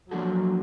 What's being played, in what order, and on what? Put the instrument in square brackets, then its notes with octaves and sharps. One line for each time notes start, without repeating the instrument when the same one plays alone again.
[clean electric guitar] F3 A#3 D4 F#4 A4 [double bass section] F#3